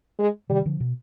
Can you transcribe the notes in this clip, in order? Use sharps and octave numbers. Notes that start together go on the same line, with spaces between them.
G#3
C3 D#3 G3
D3 F3
B2